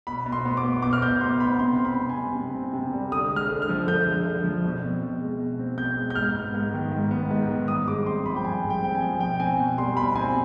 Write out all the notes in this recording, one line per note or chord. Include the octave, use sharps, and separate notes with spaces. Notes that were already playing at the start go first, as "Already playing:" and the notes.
B2 B5
B2
C6
B3
D6
B3
B2 D6
F6
B2 G6
B3 C6
B3 B5
C3 C6
C4
B5
C3
G#5
G3
C3
C4
C3
G3
D3 D#6
G#3
F6
D3
F6
F3
D3 G6
G#3
D3
F3
B2
C4
B2
G#3
B2
C4
B2 G6
G#3
G6
G#2 F6
B3
G#2
D#3
G#2
B3
G#2
D#3
G2 D#6
G#3 D6
C4 C6
F3 B5
G5
G2 G#5
G#3
G5
C4 G5
G#5
F3
B2 G5
C4 G#5
B2
G3 C6
B2 B5
C4 G#5